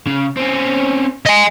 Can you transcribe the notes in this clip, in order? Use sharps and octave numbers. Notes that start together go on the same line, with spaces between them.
C#3
C4 C#4
D#5 G#5